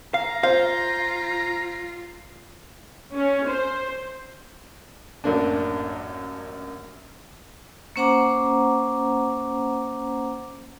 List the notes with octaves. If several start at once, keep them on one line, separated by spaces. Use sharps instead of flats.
F5 A#5
F4 C5 F5
C#4
C5
A1 F#2 A#3 D4
A#3 C#4 C5 F#5 A#5 D6